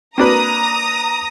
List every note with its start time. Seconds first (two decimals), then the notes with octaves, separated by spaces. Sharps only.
0.18 A#3 C4 D4 F#4 B4 A#5 D#6 A#6